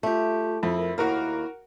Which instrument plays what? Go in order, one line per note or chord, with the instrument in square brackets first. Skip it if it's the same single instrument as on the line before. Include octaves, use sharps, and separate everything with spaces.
[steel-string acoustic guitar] A3 G4 [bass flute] F4
[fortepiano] F2 [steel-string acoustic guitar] E4
[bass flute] A#4
[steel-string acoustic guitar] D#2 A#3 [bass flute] E4 [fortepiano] F#4 A#4 F6